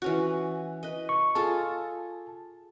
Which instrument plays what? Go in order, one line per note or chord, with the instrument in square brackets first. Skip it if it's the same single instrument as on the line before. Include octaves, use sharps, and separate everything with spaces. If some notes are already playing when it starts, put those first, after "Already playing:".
[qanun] E3 C#4 F#4
B4 D#5
[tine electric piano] C#6
[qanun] F4 G#4 A4 [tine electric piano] A5